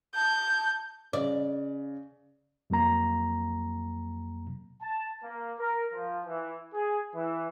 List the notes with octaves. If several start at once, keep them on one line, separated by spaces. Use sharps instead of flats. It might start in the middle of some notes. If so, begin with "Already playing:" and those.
A5 G6
C#3 D5
F2 F#3 A#3 A#5
A5
A#3
A#4
F3
E3
G#4
E3